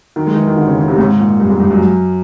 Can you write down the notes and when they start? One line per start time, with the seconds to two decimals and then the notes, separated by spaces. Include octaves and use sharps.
0.16 D#3
0.27 G#3
0.36 E3
0.48 D#3
0.57 D3
0.67 C#3
0.78 C#3
0.88 C3
0.94 A2
0.99 G#2
1.19 A#2
1.40 G2
1.50 G#2
1.60 G2
1.70 F#2